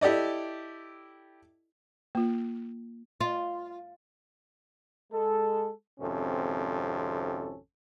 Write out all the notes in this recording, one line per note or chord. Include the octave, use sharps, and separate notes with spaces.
E4 G4 A4 D5 D#5
A#3 F4
F4
G#3 A4
G#1 F2 C3 C#4 A4